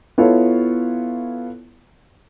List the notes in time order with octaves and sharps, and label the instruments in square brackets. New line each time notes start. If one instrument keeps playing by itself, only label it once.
[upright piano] B3 E4 F4 A4 C#5